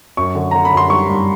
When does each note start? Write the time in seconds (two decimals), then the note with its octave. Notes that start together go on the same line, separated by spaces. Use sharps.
0.17 F#2 C#6
0.35 D3
0.51 D3 A#5
0.65 B5
0.72 F#2 C6
0.90 G3 C#6
1.09 G2